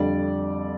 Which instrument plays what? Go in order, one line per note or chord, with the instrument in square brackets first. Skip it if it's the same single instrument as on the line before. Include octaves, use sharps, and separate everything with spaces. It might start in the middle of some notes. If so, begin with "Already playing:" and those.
Already playing: [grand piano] F2 D3 G3 D5